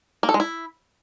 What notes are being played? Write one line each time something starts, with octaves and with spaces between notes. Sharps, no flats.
A#3
A4
G#3
E4